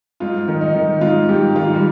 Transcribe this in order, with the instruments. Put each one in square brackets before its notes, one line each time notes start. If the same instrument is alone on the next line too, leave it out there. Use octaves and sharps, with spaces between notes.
[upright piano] G#2 F4
D#3
D#4
D#3
G#2 F4
G#2 G4
D#3 F4
G3